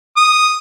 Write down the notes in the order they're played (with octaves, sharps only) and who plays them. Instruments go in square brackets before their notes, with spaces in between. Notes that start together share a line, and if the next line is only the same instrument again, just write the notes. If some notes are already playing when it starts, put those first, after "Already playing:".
[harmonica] D#6